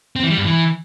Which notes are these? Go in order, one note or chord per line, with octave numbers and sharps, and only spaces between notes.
C4
E3
G3
G2
E3